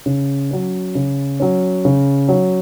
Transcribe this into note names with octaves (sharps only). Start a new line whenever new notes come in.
C#3
F#3 C#4
C#3
F#3 C#4
C#3
F#3 C#4